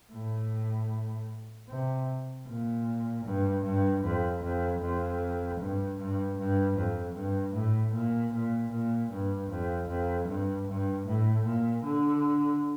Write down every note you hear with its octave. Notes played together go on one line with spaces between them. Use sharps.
A2
C3
A#2
G2
G2
F2
F2
F2
G2
G2
G2
F2
G2
A2
A#2
A#2
A#2
G2
F2
F2
G2
G2
A2
A#2
D3